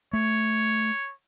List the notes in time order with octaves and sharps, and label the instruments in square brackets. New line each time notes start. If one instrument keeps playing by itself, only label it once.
[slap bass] A3 [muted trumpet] C#5